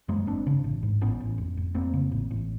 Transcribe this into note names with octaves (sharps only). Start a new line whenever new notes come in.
F#2 G#3 A#3
G1 C4 D4
C#3
A1
G#2
A1 B3 C#4
A1
F1
F1
F1 A#3 C4
C#3
A1
A1